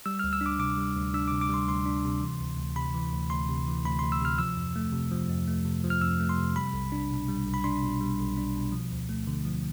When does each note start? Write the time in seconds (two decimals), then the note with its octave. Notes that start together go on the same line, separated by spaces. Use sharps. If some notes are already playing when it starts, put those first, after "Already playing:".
0.06 G3 E6
0.19 D2 F6
0.33 E6
0.41 D4
0.46 D6
0.59 C3 D6
0.78 G3
0.96 D2
1.14 D4 E6
1.28 C3 D6
1.41 D6
1.49 G3 C6
1.67 D2 C6
1.86 D4
2.05 C3
2.22 E3
2.41 D2
2.58 D2
2.76 C3 B5
2.94 E3
3.13 D2
3.30 D2 C6
3.49 C3
3.67 E3
3.84 D2 B5
3.99 D2 C6
4.12 E6
4.21 C3 F6
4.39 F3 E6
4.57 F2
4.76 A3
4.93 C3
5.11 F3
5.29 F2
5.48 A3
5.65 C3
5.84 F3
5.90 F6
6.01 F2 E6
6.20 A3
6.29 C6
6.38 C3
6.55 G3 B5
6.73 B1
6.92 D4
7.11 B2
7.28 G3
7.46 B1
7.54 B5
7.64 D4 C6
7.83 B2
8.01 G3
8.19 B1
8.37 D4
8.55 B2
8.72 F3
8.92 D2
9.09 A3
9.27 D3
9.45 F3